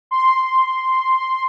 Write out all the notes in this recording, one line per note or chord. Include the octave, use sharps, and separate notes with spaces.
C6